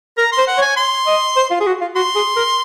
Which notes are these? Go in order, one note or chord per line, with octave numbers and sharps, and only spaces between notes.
A#4 A#5
C6
C5
F#5
C#5
G#5
C6
D#5
C5
F4
G#4
F#4
F4
F#4 C6
G#4
A#4